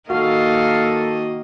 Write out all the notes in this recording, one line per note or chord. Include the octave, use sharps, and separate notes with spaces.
D#3 A#3 F#4 A4 D#5 F5